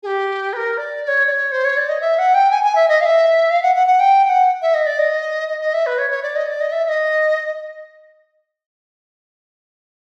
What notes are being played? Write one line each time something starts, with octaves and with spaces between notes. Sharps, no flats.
G#4
G4
B4
A#4
D5
D5
C#5
D5
C#5
C5
C#5
D5
D#5
E5
F#5
G5
G#5
G#5
E5
D#5
F5
E5
F5
F#5
F#5
F#5
G5
G5
F#5
E5
D#5
D5
D#5
D#5
D#5
E5
B4
C#5
C#5
D5
D#5
D5
D#5
E5
E5
D#5